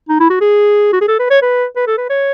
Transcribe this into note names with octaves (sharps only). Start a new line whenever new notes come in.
D#4
E4
F#4
G#4
F#4
G#4
A4
B4
C#5
B4
B4
A4
B4
C#5